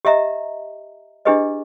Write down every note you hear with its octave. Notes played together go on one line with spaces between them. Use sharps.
G4 D#5 E5 A#5
D4 E4 G4 G#4 B4 D#5